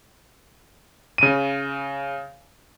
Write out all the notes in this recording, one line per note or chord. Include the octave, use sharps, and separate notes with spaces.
C#3 D#7